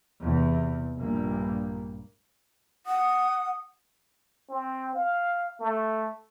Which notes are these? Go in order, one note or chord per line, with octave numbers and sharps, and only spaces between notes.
E2 C3
A#1 G2 G3 A#3
F#5 D#6
C4
F5
A3